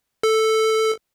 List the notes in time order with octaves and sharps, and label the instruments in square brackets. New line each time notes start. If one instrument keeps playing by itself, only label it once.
[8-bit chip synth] A4